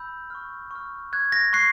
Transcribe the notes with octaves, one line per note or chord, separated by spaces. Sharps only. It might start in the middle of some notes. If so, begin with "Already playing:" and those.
Already playing: B5 E6 G6
C#6 F6
C#6 F6
C#6 F#6 G#6
A#6
C#6 F#6 C7